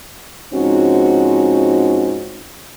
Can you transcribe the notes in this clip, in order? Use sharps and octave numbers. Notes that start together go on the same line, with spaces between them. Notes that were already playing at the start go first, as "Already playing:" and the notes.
G#2 F3 C4 C#4 D#4 F#4